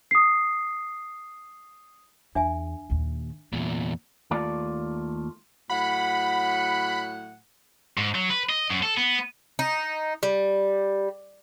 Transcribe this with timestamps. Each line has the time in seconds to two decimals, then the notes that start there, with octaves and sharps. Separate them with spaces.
0.11 D#6 C7
2.35 E2 D4 E5 G#5
2.90 D#2 A#2
3.53 E2 A#2 B3
4.31 D#2 A3 F4 D5
5.70 A2 F#3 F#5 B5
7.97 G#2
8.15 F#3
8.30 B4
8.50 D#5
8.70 F#2
8.83 A4
8.97 B3
9.59 D#4
10.23 G3